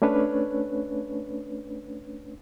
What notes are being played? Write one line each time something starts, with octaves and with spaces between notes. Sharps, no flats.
A3 C#4 D4 B4 C#5